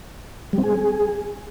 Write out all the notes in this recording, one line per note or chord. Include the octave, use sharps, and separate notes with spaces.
G3
C4
G#4